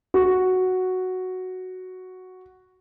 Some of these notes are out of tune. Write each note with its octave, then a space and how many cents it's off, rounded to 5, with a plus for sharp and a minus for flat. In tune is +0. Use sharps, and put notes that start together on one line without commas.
F#4 +0